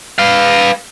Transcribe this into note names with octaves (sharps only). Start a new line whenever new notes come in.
B4 F5